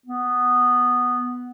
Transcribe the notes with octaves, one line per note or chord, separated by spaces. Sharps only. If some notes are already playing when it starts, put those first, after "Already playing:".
B3